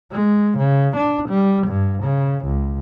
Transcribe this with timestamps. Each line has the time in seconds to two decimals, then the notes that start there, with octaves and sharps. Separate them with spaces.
0.12 G#3
0.58 C#3
0.96 D4
1.29 G3
1.67 G2
2.03 C#3
2.45 C#2